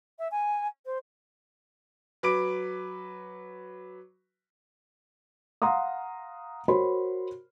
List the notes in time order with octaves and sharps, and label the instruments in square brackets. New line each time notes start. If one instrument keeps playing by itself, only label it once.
[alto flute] E5
G#5
C5
[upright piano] F#3 B4 D6 D7
[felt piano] F5 F#5 A#5 C6 D#6
F#4 A#4 C5 C#5 B5 C6